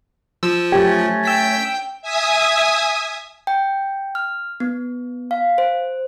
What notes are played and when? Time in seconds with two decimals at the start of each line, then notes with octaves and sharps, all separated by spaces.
0.43 F3 E6
0.72 F#2 A3 C#4 G4
1.25 G5 E6 B6
2.02 E5 G#5 D#6
3.47 G5
4.15 F6
4.60 B3
5.31 F5
5.58 C5